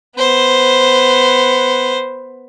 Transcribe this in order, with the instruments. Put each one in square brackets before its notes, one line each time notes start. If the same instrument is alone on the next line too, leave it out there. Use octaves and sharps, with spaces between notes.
[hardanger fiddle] B3 C5